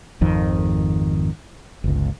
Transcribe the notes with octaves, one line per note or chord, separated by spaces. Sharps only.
G#1 F2 D#3
G1 C#2